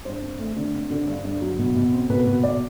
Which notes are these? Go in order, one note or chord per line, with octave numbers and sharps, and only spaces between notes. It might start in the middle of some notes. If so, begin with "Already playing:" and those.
G2 C5
C4
A3
D3
C4
D3
G2
G2
F#3
B2
B2
C4
B2 B4
B2
B2 D5